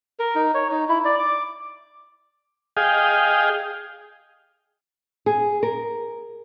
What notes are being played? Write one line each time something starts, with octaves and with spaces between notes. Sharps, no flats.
A#4
D#4
C#5
D#4
E4
D5
D6
G#4 D#5 F5 G5
G#4
A#4